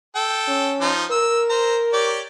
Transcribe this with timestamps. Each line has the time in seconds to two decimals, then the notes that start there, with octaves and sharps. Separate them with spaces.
0.15 A4 G5
0.48 C#4
0.81 F3 D#4 C6
1.11 A#4 E6
1.49 C5 A#5
1.93 G4 C#5 D5